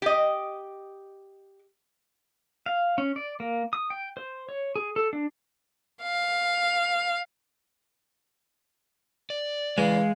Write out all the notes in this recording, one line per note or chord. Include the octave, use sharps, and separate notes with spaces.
G4 D#5
F5
C#4
D5
A#3
D#6
G5
C5
C#5
G#4
A4
D4
F5
D5
C#3 E3 G#3 F5